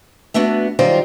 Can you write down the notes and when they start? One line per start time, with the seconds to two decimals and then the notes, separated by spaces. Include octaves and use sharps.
0.34 A3 B3 D4 F#4
0.79 D#3 F#3 G3 F4 C5